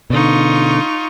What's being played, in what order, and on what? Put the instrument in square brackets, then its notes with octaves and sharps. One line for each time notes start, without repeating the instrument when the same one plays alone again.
[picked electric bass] B2 D3 [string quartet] D#4 F4 C#6